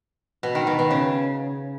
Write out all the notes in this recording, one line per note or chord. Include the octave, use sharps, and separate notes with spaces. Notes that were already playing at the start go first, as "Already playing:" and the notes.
B2
D#3
B2
B2
C#3